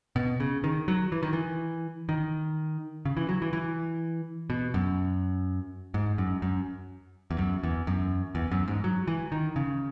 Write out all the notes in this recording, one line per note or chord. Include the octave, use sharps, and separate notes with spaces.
B2
C#3
D#3
F#3
E3
D#3
E3
D#3
C#3
E3
F#3
E3
E3
B2
F#2
G#2
F#2
F#2
E2
F#2
E2
F#2
E2
F#2
G#2
F#3
E3
D#3
C#3